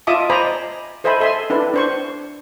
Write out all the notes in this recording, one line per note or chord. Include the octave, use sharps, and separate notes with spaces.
F4 D#5 E5 A5 D6 D#6
C5 D5 D#5 G#5 A#5 B5
A4 C5 D#5 E5 G#5 B5
A4 E5 G#5 C6
D4 E4 A4 B4
D4 C5 C#6